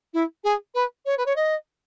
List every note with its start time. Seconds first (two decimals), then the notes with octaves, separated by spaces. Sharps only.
0.13 E4
0.44 G#4
0.74 B4
1.05 C#5
1.17 B4
1.26 C#5
1.36 D#5